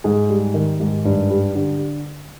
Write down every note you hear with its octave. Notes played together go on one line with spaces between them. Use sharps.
G#2 G#4
G3
D#3
G#2
G2
G3
D3